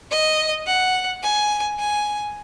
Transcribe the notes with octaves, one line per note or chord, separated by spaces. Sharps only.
D#5
F#5
G#5
G#5